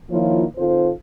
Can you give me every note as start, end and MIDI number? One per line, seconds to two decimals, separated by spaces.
0.11 0.44 51
0.11 0.44 53
0.11 0.44 58
0.11 0.44 64
0.11 0.44 65
0.11 0.44 73
0.57 0.91 51
0.57 0.91 60
0.57 0.91 65
0.57 0.91 69
0.57 0.91 72